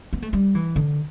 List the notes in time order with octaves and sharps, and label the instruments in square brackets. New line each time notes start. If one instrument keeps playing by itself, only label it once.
[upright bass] B3
A3
G3
E3
D3